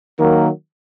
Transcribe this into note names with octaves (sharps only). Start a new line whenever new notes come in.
D#3 F#3 A#3